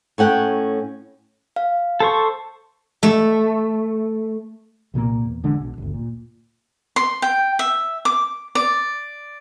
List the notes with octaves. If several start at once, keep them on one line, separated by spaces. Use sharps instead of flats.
A2 C#4 F#5 G5
F5
A4 C5 C#6
A3
C2 A#2 F3 A#3
E2
A1 D3 G#3 D4
B1
G1 D2
A#2
C6
G5
E5
D6
D5